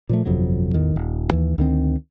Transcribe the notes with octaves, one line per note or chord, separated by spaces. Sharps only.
A#2 F3 A3
G1 F2 C3 F#3
A1 E2 D#3
D#1
D#2 E3
D2 D#3 C4